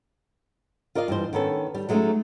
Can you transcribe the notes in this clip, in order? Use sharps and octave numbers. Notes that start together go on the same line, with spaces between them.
F4 A#4 D5 D#5 F5
G2 E3 C5
D#3 B3 C#4 A4
G3
F#3 G#3 A3 C4 C#4 D#4